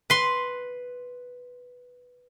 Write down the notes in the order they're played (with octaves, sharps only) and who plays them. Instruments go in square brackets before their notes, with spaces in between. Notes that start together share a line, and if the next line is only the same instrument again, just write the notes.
[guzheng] B4 C6